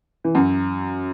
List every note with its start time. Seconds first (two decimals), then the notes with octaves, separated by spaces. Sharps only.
0.24 E3
0.35 F#2 F#3